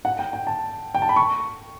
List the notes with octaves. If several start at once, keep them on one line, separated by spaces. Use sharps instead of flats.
F#5
G5
G5
A5
G5
A5
B5
C#6